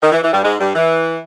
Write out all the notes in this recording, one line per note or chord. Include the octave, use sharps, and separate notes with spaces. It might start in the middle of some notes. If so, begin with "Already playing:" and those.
D#3
E3
E3
G2 G3
G#2 G#3
G2 G3
E3